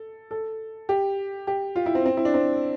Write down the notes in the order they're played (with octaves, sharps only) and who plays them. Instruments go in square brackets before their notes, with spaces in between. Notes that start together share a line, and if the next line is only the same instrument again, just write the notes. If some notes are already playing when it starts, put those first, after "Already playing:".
Already playing: [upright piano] A4
A4
G4
G4
F4
E4
C4
C4
E4
D4
C4